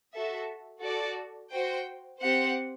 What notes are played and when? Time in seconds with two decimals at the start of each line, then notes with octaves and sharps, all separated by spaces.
0.11 F#4 A4 E5
0.82 F#4 A4 D5
1.51 F#4 C5 G5
2.19 C4 G4 C5 F#5